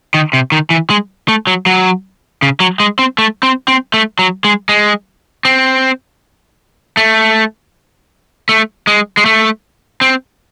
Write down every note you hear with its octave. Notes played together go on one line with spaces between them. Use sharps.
D#3
C3
D#3
E3
G#3
A3
F#3
F#3
C#3
F#3
G#3
C4
A3
C4
C4
A3
F#3
G#3
G#3
C4
A3
A3
G#3
G#3
A3
C4